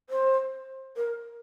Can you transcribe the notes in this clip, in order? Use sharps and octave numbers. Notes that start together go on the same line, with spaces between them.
C5
A#4